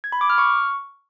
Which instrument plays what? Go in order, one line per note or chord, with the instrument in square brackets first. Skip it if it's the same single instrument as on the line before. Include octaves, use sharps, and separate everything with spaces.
[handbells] G#6
B5
D6
F6
C#6